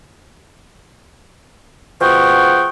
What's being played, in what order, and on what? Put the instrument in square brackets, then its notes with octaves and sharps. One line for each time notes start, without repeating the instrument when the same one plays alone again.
[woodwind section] B2 F3 G#4 F#5 G5 C#6